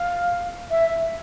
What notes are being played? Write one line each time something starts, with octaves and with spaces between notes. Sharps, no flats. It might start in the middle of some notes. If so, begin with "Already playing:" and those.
Already playing: F5
E5